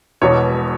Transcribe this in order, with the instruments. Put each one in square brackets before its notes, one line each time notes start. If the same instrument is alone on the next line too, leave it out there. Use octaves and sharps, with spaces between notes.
[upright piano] E1 E2 B2 C#5